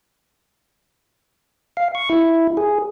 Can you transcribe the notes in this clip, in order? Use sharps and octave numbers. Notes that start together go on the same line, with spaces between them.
F5
C#6
E4
G#4